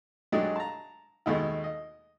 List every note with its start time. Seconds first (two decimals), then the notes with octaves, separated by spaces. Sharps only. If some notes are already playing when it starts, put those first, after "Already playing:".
0.32 F#3 G#3 A3 D4 G4 G#4
0.56 A5 A#5
1.26 D#2 B2 G#3 A3
1.64 D#5